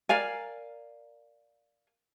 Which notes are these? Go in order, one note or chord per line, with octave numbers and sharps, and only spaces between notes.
A#4 D5 F5 G#5